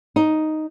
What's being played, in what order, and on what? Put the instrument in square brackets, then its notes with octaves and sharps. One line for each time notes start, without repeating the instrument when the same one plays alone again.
[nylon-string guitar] D#4